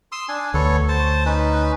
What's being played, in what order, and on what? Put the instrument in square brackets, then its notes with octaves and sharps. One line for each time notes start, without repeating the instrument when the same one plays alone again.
[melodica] C6 D#6 E6
D4 G#5
[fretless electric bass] D2 [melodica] B3 A4 C#5
[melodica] C5 A5
C#4 D#4 B4